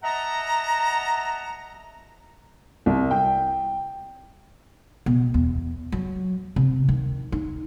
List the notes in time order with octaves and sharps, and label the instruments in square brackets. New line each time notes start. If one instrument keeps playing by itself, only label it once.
[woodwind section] D#5 E5 F#5 A5 A#5
[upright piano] C2
G5
[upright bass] B2
E2
F#3
C3
D#3
D#4